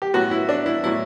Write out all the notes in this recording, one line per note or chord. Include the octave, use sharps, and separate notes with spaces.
G4
A2 F#3 B3 F#4
E4
D4
E4
A2 F#3 B3 E4